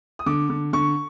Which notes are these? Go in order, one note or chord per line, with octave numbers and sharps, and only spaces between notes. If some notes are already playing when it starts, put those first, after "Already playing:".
D#6
D3 D6
D3
D3 C#6